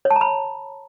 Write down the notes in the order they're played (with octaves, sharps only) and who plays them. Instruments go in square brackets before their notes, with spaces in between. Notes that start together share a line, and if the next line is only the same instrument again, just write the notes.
[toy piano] C#5
A5
A#5
B5